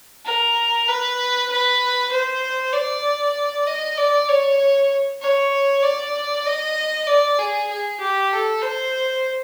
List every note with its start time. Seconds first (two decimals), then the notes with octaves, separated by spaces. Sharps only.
0.25 A#4
0.88 B4
1.50 B4
2.12 C5
2.73 D5
3.67 D#5
3.97 D5
4.29 C#5
5.21 C#5
5.83 D5
6.46 D#5
7.07 D5
7.39 G#4
7.70 G#4
8.00 G4
8.32 A4
8.62 C5